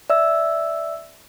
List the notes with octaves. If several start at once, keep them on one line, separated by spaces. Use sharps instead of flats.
D5 E5 E6